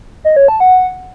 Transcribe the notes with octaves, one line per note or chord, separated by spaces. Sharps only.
D#5
C#5
A5
F#5